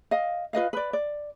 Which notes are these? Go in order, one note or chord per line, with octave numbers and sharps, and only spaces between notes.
D#5 F5
F4 B4 D#5 F5
B4 D5
D5